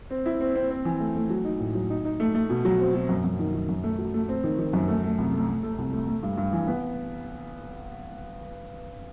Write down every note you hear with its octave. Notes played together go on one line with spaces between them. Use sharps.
C4
E4
C4
C4
C4
E3
A3
A3
F#3
D#4
A2
F#3
D#4
D#4
A3
A3
B2
F#3
C4
B2
F#2
F#2
D#3
D#3
F#2
A3
F#3
A3
C4
D#3
D#3
F#2
A3
A3
C2
A3
A3
A3
C2
A3
A3
G2
G2
E3
B3